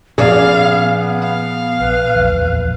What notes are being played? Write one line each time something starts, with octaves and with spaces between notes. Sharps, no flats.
A#2 F3 B3 C#4 G#4 D5 F5
B3
F5
A#1 B4
D1 A#1 E2